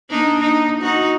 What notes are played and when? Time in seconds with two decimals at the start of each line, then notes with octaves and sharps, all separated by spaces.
0.10 A#3 D4 D#4
0.40 D#4
0.81 D#4 F#4